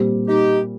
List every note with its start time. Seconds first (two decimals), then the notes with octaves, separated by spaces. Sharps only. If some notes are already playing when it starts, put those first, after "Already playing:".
Already playing: A#2 G3 C4
0.27 D#4 G4